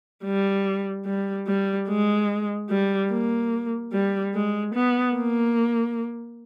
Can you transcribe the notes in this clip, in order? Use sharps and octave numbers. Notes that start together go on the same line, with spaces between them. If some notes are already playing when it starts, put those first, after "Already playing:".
G3
G3
G3
G#3
G3
A#3
G3
G#3
B3
A#3